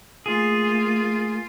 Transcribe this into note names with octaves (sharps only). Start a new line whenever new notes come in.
A3 A#3 F4 G#4